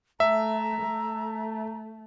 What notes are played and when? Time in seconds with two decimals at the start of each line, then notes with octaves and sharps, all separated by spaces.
0.20 A3 E5 A#5
0.81 A3